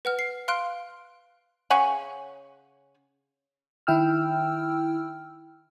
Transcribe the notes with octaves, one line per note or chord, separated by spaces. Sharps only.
B4 F#5 F6
C7
F5 C6 F6 F#6 D7
C#3 C#5 F#5 G#5
D#3 E4 G5 E6 F6